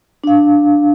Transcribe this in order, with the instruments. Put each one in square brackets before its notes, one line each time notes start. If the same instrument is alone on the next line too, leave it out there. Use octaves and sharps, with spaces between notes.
[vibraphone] D4 F5